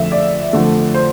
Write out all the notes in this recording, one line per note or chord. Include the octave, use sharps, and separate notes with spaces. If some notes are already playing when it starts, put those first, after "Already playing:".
Already playing: F2 D3 F3 A3 E5
D5
F2 D3 A3
C5